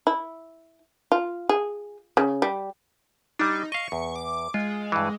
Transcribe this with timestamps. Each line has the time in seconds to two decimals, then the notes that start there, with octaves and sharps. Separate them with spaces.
0.07 E4
1.12 F4
1.49 G#4
2.17 C#3
2.42 G3
3.39 G3 D4 D#4
3.72 D#5 F5 C#6
3.92 E2
4.16 D6
4.54 G#3 F4
4.92 G2 E3